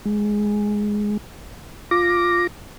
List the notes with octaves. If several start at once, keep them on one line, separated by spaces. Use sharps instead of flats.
G#3
F4 D6 A#6